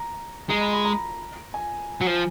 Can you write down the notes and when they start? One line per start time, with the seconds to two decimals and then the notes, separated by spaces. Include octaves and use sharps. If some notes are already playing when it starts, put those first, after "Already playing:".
Already playing: A#5
0.49 G#3 A#5
0.61 B5
0.73 B5
0.85 A#5
1.54 G#5
2.01 F#3
2.06 F3